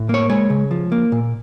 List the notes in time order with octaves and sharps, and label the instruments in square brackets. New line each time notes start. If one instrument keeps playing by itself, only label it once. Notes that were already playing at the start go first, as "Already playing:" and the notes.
Already playing: [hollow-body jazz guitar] A2
A#3 C#5
G#3 C#5
C#3
F3
A#3
A#2